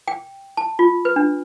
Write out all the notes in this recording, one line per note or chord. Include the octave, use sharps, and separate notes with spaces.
G5
A5
F4
B4
D4